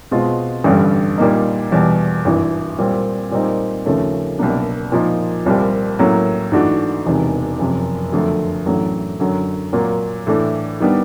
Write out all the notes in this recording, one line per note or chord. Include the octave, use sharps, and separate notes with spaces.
B2 G#3 C4 F4
A1 G2 D3 G3
A#2 G3 A#3 D#4
E2 B2 G3
G#1 G2 E3
A#2 G3 C4
A#2 G3 C4 D#4
D#2 C#3 F3 A3 C#4
C2 B2 F#3 A#3 D4
A#2 F3 A#3 D#4
C2 A#2 G3 C4
A2 F#3 A#3 C#4
G#2 E3 A3 D4 F#4
E1 E2 C3 D#3
F#1 F2 C3
F2 D3 F#3 A3
A1 A2 F#3 A3 D4
F#2 D3 F#3
A#2 F#3 A#3
A2 E3 A3 D4
D#3 G3 B3 D4